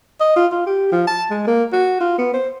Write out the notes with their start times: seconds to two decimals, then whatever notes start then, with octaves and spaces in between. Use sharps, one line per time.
0.20 D#5
0.36 F4
0.52 F4
0.66 G4
0.92 F3
1.07 A5
1.31 G#3
1.47 A#3
1.73 F#4
2.01 F4
2.18 B3
2.34 C5